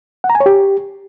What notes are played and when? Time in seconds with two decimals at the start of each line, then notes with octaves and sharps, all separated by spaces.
0.24 F#5
0.30 A#5
0.35 G#5
0.40 C#5
0.46 G4